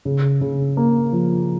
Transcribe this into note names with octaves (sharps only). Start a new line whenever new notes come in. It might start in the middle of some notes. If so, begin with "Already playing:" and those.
C#3
C#3
A#3
F3